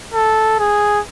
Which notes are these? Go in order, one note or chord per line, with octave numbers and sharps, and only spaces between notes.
A4
G#4